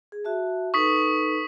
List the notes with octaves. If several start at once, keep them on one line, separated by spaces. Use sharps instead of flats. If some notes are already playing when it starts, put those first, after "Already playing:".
G#4
F#4 E5 A5
D#4 A4 B4 C#6 D#6 B6